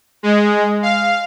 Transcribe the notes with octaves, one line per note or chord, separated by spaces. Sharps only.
G#3
F5